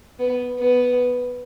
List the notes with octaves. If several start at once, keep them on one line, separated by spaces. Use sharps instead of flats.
B3
B3